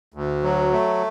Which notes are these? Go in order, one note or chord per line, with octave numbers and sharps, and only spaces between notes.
D2
F#3
A3